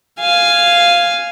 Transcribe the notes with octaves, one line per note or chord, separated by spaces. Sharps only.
F5 G#5